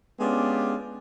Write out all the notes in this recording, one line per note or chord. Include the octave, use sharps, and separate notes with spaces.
G#3 B3 C#4 D4 F4 G4